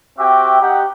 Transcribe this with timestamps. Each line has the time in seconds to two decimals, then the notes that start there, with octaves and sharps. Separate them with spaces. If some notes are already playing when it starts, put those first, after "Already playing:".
0.18 C4 F#4 G4 E5 G5 D6
0.61 D#4 G4 F#5